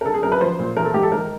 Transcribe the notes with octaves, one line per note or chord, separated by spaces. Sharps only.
A#4
D3 A4
G#4
F#2 A#4
B4
F3 C5
A#2
E3 A#4
A4
G#2 G4
A4
D#3 A#4